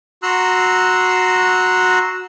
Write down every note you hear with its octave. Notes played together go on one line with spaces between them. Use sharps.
F#4 A#5 C6 E6 F#6